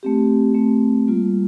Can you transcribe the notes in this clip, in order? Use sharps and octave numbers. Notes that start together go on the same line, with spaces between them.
A3 C4 G4
A3 C4 G4
G3 A#3 F4